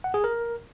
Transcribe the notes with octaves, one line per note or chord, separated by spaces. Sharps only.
F#5
G#4
A#4